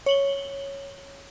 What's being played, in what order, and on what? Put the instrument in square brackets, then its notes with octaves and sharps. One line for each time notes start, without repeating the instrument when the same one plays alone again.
[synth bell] C#5 F#7 G7